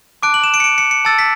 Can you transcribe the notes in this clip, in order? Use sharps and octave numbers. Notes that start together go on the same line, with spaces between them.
A5 D6 F#6 D7
F#7
E7
D7
C#7
D7
C#7
C#7
A5 E6 A6
B6